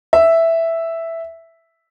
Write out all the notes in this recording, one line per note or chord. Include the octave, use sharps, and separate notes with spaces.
E5